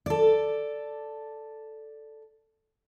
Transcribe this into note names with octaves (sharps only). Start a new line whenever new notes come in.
A4 D5